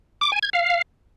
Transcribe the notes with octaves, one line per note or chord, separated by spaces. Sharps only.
D6
G#5
G#6
F5